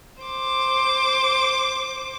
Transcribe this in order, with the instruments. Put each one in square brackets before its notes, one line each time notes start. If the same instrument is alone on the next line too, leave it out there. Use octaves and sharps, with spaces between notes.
[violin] C5 D6